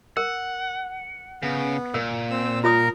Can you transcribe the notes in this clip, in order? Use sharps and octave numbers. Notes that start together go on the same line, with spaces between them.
A#4 F#5
C#3 B3
A#2 A#4
C4 E6
F4 A#4 C#5 A#5 D#6